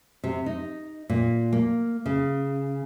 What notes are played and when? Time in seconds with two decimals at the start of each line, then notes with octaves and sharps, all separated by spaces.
0.24 C3
0.46 D#4
1.09 A#2
1.53 A#3
2.06 C#3